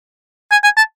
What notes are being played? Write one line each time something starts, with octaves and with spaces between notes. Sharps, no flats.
G#5
G#5
A5